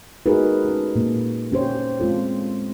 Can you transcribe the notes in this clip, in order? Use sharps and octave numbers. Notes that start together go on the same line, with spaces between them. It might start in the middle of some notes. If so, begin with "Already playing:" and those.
G#3 D#4 F#4 G#4 A#4 B4
C#4 A4
A#2 A#3
C#4 G4 C5 C#5
G#3 C4 F4 A4